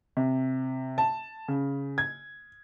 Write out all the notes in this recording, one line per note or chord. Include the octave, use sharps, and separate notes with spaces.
C3
A5
C#3
G#6